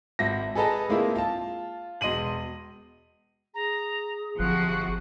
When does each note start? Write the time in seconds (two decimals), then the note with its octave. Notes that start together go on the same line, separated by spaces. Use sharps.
0.19 G#1 E5 A#6
0.55 G#4 A4 B4 D#5 A5 A#5
0.89 G#3 A#3 C4 E4 F4
1.15 F4 A5
2.01 E1 D#5 C6 D#7 F#7
3.54 G#4 A#5
4.39 G1 C3 F3 F#4 F#6